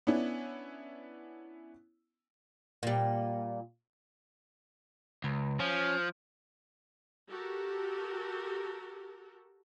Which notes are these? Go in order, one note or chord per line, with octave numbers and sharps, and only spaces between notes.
B3 C#4 D4 E4
A#2 G3
C#2
F3 C#4
F#4 G4 A4 A#4